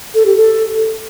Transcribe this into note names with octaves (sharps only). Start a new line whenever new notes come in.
A4
G4
A4